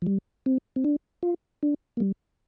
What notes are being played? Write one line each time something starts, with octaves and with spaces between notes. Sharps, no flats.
F3
G3
C4
C4
D4
F4
D4
A#3
G3